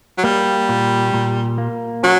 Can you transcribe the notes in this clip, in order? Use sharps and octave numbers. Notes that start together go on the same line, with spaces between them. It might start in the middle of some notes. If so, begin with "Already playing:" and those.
F#3
G3 A#3
A#2
A#2
A#3
F#3 C#4